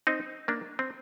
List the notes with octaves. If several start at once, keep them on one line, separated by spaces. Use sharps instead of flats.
C4 D#4
A#3 D4
C4